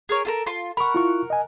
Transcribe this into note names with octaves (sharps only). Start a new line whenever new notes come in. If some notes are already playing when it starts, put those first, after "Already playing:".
G#4 A#4 C#5
F4 A4 A#4
F4 C6
A#4 F#5 B5 C#6
E4 F4 C#6
D#5 G#5